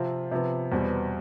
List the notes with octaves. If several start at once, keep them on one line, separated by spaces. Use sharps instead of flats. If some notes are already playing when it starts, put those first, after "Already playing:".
Already playing: C3 F3 C4 F4
C3 F3 B3
E2 B2 G3 C4